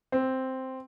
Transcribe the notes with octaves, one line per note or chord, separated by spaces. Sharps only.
C4